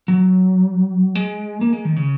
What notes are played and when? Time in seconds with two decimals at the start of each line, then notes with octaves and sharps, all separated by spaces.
0.08 F#3
1.15 G#3
1.61 A#3
1.73 G#3
1.85 D#3
1.96 C#3